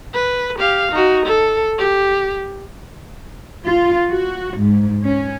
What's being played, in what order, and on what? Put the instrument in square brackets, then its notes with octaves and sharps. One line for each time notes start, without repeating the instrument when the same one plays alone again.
[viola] B4
G4 F5
D#4 F#4
A4
G4
[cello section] F4
F#4
G#2
C#4